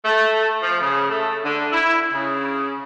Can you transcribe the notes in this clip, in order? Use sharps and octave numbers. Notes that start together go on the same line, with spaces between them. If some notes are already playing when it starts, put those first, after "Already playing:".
A3
F3
C#3
A3
D3
E4
C#3